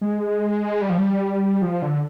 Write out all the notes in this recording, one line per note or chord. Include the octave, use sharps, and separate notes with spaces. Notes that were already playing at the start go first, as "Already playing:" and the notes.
G#3
G3
F3
G3
F3
D3